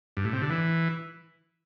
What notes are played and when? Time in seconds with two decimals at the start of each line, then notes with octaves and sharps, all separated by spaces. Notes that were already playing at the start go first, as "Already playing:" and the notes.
0.17 G2
0.25 A2
0.33 C3
0.42 D3
0.50 E3